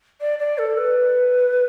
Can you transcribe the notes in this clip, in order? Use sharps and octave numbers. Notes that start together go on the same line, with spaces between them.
D5
D5
A4
B4